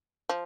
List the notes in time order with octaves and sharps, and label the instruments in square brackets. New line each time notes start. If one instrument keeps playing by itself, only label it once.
[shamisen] F3